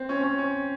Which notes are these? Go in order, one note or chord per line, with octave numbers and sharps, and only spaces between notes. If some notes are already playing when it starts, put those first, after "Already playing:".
Already playing: C4
C#4
C#4
C#4